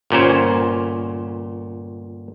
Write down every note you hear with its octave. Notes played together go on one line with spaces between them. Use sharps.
G1 A#2 C#4 C5